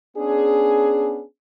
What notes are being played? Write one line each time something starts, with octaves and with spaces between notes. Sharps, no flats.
B3 C#4 D4 G#4